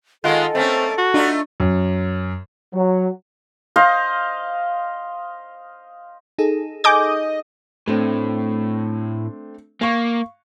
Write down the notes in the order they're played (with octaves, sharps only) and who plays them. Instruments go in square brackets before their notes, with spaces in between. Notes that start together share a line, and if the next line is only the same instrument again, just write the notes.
[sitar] D#3 G#3 [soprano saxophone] F4 [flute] A4 [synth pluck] F#5 G#5
[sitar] A3 A#3 C#4 [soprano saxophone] C4
[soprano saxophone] F#4
[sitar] A3 D#4 F4 [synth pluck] D4
[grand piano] F#2
[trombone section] F#3
[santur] C5 D#5 F5
[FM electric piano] D#4 G#4 A4
[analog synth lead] D#5 [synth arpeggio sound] G#5 D6 G6
[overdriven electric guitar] A2 [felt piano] A3 C4 D4
[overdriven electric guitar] A#3 [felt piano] F5 C#6